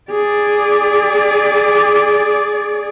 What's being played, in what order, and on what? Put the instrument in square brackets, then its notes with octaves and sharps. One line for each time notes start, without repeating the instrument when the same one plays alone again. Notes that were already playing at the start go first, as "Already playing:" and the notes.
[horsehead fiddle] G#4 D5